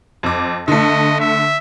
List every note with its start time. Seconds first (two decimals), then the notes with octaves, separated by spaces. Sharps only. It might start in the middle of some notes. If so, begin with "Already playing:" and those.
0.23 F2 D6
0.68 D3 A3 D#5
1.20 E5